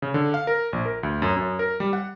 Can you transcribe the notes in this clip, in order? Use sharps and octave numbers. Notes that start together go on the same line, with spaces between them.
C#3
D3
F5
A#4
A#1
A#4
D2
F#2
F#2
A#4
G3
F#5